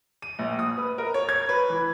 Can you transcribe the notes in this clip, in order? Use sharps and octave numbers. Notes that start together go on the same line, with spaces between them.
D#7
A#1
D#6
B4
A#4
C#5
G#6
B4
E3